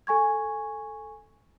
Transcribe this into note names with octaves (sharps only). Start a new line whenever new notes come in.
A4 G#5 C#6 G#6